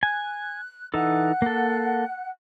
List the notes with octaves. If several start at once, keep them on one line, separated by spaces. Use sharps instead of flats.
G#5 F#6
E3 D#4 A4 F#5 F#6
A#3 A4